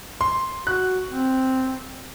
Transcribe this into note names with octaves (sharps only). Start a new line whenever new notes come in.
C6
F#4 F#6
C4